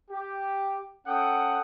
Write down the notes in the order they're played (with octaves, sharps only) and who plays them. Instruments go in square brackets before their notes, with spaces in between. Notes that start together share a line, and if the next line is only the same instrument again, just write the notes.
[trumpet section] G4
C#4 A4 F#5 G5 D#6